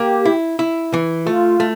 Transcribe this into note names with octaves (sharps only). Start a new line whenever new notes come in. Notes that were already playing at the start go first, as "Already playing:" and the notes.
Already playing: A#3 G4
E4
E4
E3
A3 F4
A3